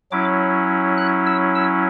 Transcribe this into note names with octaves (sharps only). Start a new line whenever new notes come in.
F#3 C#4 E4 D6
F#6
E6
E6